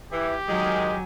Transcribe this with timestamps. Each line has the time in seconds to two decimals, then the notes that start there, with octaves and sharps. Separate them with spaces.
0.12 E3 G4
0.49 D#3 F#3 G#3 G#5